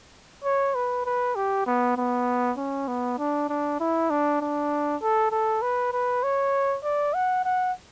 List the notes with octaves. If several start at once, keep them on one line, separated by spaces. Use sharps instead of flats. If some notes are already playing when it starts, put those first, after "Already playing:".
C#5
B4
B4
G4
B3
B3
C#4
B3
D4
D4
E4
D4
D4
A4
A4
B4
B4
C#5
D5
F#5
F#5